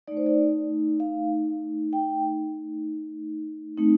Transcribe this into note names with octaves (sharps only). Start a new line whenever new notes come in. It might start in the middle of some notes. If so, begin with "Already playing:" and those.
A3 D#4 D5
C5
D5
F5
G5
A3 C4 D#4